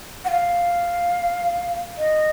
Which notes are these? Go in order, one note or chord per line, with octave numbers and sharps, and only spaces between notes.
F#5
F5
D#5